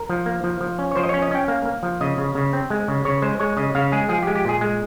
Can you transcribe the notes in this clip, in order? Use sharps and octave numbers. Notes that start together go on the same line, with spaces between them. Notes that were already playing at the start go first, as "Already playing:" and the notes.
Already playing: A#4
F3
A#3
F3
F3
C#4
C#5
F3 C5
D#5
C#5
C#4
D#5
C#4 G5
A#3 F5
A#3
F3
C#3 D#5
C#3
C#3
C4
G#3
C#3
C#3 C#5
G#3 C5
G#3 C#5
C#3 D#5
C#3 F5
G#3 G#4
F3 G#4
G4
G#3
G4
A#2 G#4
G#3